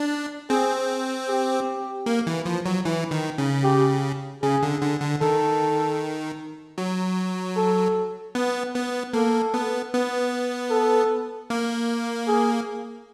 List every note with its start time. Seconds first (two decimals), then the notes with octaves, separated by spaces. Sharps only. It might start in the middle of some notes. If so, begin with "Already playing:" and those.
Already playing: D4
0.50 C4 G#4
1.28 G4
2.06 A#3
2.27 E3
2.46 F3
2.66 F#3
2.85 E3
3.11 D#3
3.38 C#3
3.64 G4
4.43 C#3 G#4
4.63 D3
4.82 D3
5.02 D3
5.21 D#3 A4
6.78 F#3
7.57 A4
8.35 B3
8.75 B3
9.13 A#3 A4
9.54 B3
9.93 B3
10.71 A4
11.50 A#3
12.28 G#4